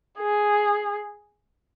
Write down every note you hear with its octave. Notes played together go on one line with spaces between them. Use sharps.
G#4